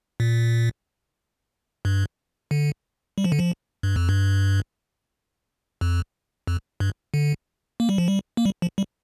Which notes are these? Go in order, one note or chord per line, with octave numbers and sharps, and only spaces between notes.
A#2
G2
D3
G3
F3
D3
F3
G2
F2
G2
F2
F2
G2
D3
A#3
G3
F3
G3
A#3
G3
F3
G3